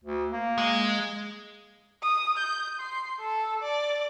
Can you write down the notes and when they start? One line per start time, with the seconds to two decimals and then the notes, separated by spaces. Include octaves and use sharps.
0.04 D2
0.32 A#3
0.58 G#3
2.02 D#6
2.37 G6
2.80 C6
3.21 A4
3.62 D5